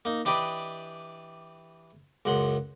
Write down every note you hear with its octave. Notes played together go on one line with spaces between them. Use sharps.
A#3 D#4
E3 D4 G4 B4 D5 D#5
C#2 F#2 F#5 C6